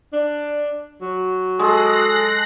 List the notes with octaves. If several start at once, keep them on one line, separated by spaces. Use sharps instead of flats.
D4
F#3
G#3 G#4 A4 F#6 A#6 C7